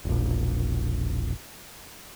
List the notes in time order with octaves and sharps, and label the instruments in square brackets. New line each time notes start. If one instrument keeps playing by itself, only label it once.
[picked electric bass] E1 A#1